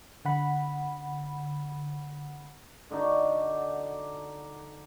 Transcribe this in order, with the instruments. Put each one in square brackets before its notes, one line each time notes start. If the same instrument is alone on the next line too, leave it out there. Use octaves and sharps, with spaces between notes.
[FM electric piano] D3 F#5 B5
[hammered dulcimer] D3 D4 D#4 F#4